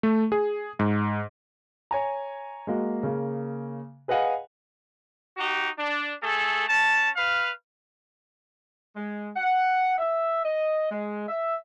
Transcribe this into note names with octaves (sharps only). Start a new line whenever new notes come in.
A3
G#4
G#2
C#5 G#5 A#5
G#3 A#3 F#4
C#3 A#3
G#4 B4 D#5 F5 F#5 G#5
D#4 F#4 G4
D4
A3 G#4 A4
C#4 A5
B4 F5
G#3
F#5
E5
D#5
G#3
E5